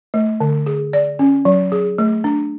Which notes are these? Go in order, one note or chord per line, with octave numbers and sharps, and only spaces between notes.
A3
D3
G#4
D5
C#4
F#3
G#4
A3
D4